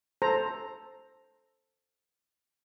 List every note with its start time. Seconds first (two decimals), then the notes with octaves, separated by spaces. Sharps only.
0.22 A4 C5 A#5